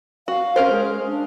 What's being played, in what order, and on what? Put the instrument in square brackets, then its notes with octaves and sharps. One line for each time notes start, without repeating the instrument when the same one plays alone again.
[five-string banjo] F#4 [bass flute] F5
[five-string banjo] C#4 A#4 C5
[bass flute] G#3
D4